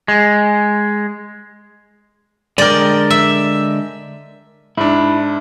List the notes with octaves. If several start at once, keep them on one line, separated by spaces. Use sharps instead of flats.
G#3
D3 G#3 A#4 D5 G5
E5
G#2 D4 E4